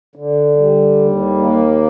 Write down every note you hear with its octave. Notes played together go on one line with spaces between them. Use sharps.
D3
G3
D#2
A#3